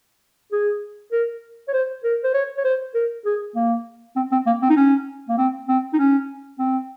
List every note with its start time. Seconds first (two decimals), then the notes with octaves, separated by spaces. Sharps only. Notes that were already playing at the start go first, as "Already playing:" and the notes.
0.52 G#4
1.12 A#4
1.68 C#5
1.73 C5
2.04 A#4
2.24 C5
2.34 C#5
2.58 C#5
2.65 C5
2.95 A#4
3.25 G#4
3.56 A#3
4.16 C4
4.32 C4
4.47 A#3
4.62 C4
4.70 D#4
4.77 C#4
5.29 A#3
5.38 C4
5.68 C4
5.94 D#4
5.99 C#4
6.59 C4